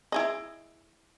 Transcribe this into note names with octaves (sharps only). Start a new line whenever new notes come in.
E4 G#4 D#5